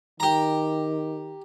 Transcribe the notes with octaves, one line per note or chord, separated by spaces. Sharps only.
D#3 G4 A#5